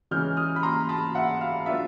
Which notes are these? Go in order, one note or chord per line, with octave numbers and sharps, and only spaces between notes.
C#3 E3 G#3 C#4 F6 G6
D#6 F6
B5
A#5 C6
A5 B5
E5 F#5
F5
F#3 B3 D4 F4 E5